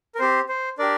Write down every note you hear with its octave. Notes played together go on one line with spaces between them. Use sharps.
A#4
C4 G4 C5
C5
D4 G4 A#4 D5